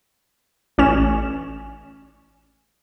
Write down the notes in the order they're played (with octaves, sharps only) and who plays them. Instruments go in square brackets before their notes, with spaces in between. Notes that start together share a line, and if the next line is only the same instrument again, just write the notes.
[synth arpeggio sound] A1 C#4 E7